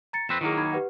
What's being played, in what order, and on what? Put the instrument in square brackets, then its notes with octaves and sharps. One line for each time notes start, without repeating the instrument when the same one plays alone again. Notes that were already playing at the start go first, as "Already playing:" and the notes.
[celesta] A#5 A6 C#7
[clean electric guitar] F2 C4 B4 [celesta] E7
[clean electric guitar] D#3 F#3 A#3 [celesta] E4 G#4
[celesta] D#4 B5 G#6
G4 B4 F#5